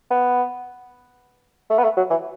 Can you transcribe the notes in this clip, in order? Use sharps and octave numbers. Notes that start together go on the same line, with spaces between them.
B3
A3
B3
A3
F#3
E3